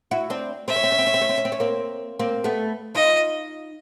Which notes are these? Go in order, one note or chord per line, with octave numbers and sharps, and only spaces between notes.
E4 F#4
C4 D4
C4 E5
C#4
C4
C#4
C4
C#4
C4
C#4
C4
C#4
C4
C#4
A#3 C4
A#3 C4
A3 B3
D#4 F4 D#5